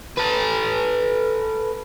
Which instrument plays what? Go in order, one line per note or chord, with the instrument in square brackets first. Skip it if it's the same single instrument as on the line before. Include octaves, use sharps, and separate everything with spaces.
[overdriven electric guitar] A4 B4